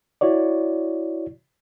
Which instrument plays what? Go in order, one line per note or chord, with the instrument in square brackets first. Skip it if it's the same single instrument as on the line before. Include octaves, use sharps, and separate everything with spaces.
[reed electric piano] E4 F#4 C#5 D5